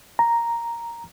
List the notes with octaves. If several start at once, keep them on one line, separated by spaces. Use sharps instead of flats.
A#5